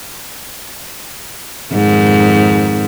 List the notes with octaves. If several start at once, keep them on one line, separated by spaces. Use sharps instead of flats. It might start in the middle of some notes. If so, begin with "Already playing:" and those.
F2 G#2 D#3